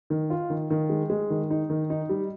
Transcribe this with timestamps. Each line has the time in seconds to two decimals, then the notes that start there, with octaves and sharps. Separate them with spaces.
0.10 D#3
0.30 F4
0.50 D#3
0.70 D#3
0.90 G#3
1.10 G#3
1.30 D#3
1.50 D#4
1.70 D#3
1.90 D#4
2.09 G3